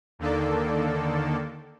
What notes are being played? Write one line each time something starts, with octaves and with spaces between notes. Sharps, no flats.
D#2 D3 D#3 A#3 A4 D5